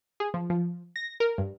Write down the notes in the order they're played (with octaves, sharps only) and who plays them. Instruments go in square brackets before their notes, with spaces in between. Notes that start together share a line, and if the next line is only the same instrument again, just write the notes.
[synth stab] G#4
F3
F3
A#6
A#4
G2